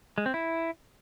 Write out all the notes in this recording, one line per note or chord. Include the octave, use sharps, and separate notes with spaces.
G#3
C4
E4